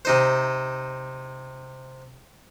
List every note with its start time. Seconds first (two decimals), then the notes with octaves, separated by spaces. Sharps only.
0.05 C3 D#4 C5